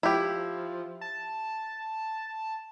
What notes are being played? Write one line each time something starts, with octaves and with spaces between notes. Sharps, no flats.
F3 E4 G4
A5